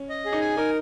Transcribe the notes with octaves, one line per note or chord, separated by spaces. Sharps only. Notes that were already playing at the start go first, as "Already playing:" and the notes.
Already playing: C#4
D#5
G#4
D#4
G#5
D#4 A#4